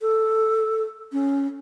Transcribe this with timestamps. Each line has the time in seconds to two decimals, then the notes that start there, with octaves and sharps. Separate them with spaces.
0.01 A4
1.12 C#4